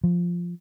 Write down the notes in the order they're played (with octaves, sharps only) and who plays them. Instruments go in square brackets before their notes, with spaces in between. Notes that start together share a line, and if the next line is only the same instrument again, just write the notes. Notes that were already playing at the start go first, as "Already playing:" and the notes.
[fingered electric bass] F3